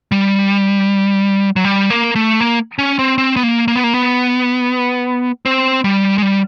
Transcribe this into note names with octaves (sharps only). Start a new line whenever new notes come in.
G3
F#3
G3
A#3
A3
A#3
C#4
C4
C4
B3
A#3
A#3
B3
A#3
B3
C4
G3
G#3
G3